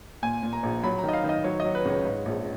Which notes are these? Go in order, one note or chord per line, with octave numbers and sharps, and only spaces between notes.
A#2 G#5
A#2
A#5
A#1
F#3 B5
D#3 A#5
D#5
F5
D#3 D#5
F#3 C#5
F#3 D#5
B4
C#2 C#5
G#2
A#1